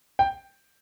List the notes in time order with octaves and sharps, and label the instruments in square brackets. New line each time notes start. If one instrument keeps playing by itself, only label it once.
[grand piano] G5